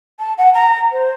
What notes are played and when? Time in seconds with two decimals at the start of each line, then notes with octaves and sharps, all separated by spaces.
0.19 A5
0.38 F#5
0.54 A#5
0.92 C5